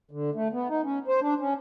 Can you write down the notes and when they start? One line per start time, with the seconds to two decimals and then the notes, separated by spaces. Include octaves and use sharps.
0.11 D3
0.35 A3
0.53 B3
0.69 D#4
0.84 C#4
1.08 C5
1.22 D4
1.40 C#4